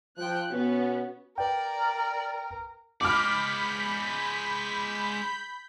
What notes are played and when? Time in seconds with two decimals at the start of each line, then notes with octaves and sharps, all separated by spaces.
0.17 F3 G5 F#6
0.50 B2 B3 C#4 F#4
1.38 A#4 B4 D5 G5
3.01 G#3 D5 B5 D6 F6 G6 B6